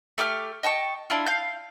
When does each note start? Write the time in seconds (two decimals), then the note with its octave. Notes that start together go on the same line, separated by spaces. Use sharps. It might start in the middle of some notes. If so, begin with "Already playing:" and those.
0.18 A3 G4 D6 F6
0.63 D#5 G5 A5 C#6
1.10 D4 E4 F4
1.26 F5 G6